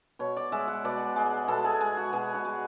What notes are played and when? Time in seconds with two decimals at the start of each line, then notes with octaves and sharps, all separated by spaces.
0.19 B2 C#5
0.36 D5
0.52 G#3 E5
0.68 F#5
0.85 B2 D5
1.16 G#3
1.48 B2 A4
1.65 G#4
1.81 G#3 G#4
1.97 F#4
2.13 B2 G#4
2.34 F#4
2.45 G#3